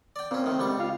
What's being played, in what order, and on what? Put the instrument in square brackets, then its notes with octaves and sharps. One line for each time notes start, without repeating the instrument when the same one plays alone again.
[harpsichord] D5 G5
[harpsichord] A#2 C#4 [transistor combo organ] C4
[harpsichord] A2 D#3
C#2 G3 C#6
[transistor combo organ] F4 F5